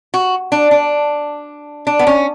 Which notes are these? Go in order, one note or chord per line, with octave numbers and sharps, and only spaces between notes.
F#4
D4
D4
D4
B3
C#4